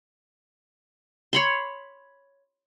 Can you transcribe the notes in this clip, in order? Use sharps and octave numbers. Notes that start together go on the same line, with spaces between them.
C#5 B5 C6